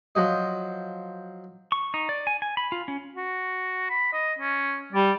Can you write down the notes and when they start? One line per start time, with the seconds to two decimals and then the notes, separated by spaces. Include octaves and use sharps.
0.15 F3 F#3 D#5
1.72 C#6
1.94 D#4
2.09 D5
2.27 G#5
2.42 G#5
2.57 B5
2.72 F4
2.88 C#4
3.16 F#4
3.89 B5
4.13 D#5
4.39 C#4
4.93 G3 D5